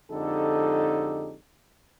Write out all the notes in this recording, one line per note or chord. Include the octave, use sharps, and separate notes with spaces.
F2 D3 G#3 D#4 G4 A4